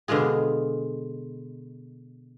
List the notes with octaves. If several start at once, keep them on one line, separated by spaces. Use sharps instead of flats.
B2 D3 G#3 F4 G#4